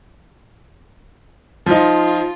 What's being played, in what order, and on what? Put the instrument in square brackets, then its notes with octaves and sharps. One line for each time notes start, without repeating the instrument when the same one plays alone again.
[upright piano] F3 D#4 [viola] F4